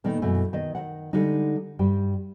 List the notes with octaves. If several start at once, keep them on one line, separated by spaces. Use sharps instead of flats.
A#2 D#3 A3 B3 D#4
F#2 B2 E3 A3
D#3 B3 D#5
D#3 E3 F#5
D3 G3 G#3 D#4
G2 G3 G5